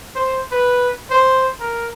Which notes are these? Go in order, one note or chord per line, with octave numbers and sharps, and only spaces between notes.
C5
B4
C5
A#4